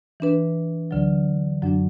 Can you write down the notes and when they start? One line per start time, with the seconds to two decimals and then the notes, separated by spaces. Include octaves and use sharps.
0.20 E3 D4 B4
0.91 D2 D3 F#3
1.62 F#2 F#3 D4